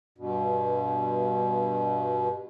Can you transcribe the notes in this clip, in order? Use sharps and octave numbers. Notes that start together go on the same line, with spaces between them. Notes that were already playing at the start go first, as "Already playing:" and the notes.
G2 B2